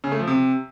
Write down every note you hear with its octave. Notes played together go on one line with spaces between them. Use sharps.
C#3
A3
F3
C3